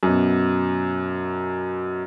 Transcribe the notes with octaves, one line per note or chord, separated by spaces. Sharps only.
F#2 B2